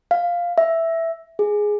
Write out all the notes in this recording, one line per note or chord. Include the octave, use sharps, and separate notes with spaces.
F5
E5
G#4